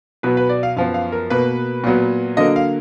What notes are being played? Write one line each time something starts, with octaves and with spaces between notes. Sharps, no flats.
B2 F#3 B3 B4
B4
D5
F5
F#2 F3 B3 F5
F5
A#4
B2 A#3 B4
A#2 F#3 B3
D3 F#3 A#3 D#5
F5